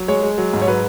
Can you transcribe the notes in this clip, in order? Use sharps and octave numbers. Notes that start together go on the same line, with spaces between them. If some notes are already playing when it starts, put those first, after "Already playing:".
Already playing: F#3
G#3 C#5
G#3
F#3
G#2
C#5
F#3 B4